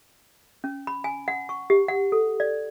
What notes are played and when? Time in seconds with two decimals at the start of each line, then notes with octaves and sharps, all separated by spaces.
0.64 C#4
0.87 B5
1.04 G#5
1.28 F#5
1.49 C#6
1.70 G4
1.88 F#5
2.12 A4
2.40 D5